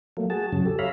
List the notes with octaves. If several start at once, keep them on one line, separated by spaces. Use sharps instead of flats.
F#3 A3 A#3
F#4 G#4 A5
F#2 C#3 F#3
G4 A4
C#5 E5 F5 A#5 B5